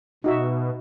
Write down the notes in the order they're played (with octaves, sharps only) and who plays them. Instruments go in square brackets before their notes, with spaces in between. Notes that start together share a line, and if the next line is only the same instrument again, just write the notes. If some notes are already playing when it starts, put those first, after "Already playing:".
[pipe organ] B2 [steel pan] D#4 F#4 E5